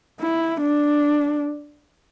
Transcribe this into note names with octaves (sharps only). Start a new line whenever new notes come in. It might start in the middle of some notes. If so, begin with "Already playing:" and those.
E4
D4